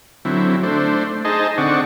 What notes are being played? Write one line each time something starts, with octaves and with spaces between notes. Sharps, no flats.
D3 F#3 C4 E4
A3 D4 C5
D#4 G#4 C5 D#5 A5
D3 C4 D5 F#5 C#6